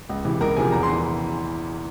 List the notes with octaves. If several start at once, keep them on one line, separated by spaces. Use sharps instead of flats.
C#2
C3 E3
C#2 A#4 A#5
C3 F3 G#4 G#5
E2 A#5
C6
E3